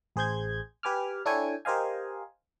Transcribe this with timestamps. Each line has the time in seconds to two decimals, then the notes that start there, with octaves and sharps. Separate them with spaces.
0.16 A1 G#4 C5 G6 G#6
0.83 G4 B4 G#5 D6 F6
1.26 D4 E4 A4 C#5 G5 G#5
1.65 G4 A#4 C5 D#5 F5 G#5